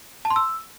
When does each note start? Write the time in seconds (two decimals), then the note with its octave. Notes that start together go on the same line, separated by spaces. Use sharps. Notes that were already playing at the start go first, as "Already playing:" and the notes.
0.25 A5
0.30 C6
0.36 E6